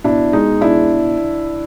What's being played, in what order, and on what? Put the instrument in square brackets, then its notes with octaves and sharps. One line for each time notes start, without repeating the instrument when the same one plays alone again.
[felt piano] B2 D4 E4
G#3 D#4
B2 D4 E4